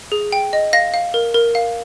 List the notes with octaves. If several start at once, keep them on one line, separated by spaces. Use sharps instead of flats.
G#4
G5
D#5
F5 A#6
F5
A#4
A#4
F5